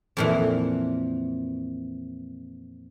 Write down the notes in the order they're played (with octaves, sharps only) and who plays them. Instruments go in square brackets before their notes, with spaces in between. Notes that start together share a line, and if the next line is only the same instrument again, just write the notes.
[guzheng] F2 A#2 E3